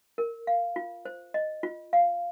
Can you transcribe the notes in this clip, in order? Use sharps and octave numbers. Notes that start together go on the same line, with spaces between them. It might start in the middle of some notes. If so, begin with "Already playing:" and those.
A#4
F5
F4
C5
D#5
F4
F5